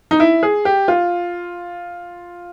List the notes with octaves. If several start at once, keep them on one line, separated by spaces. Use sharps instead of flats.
D#4
E4
G#4
G4
F4